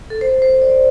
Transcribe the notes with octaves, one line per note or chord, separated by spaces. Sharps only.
A4
C5
C5
D5